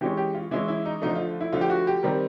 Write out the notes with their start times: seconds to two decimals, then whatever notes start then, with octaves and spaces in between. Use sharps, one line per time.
0.01 E3 G#3 C#4 G4
0.17 G4
0.35 F4
0.51 E3 G#3 C#4 E4
0.68 E4
0.86 D#4
1.02 D3 F3 A3 D#4
1.15 F4
1.41 E4
1.53 D3 F3 A3 F4
1.61 G4
1.70 F#4
1.87 G4
2.03 D#3 G3 C4 A#4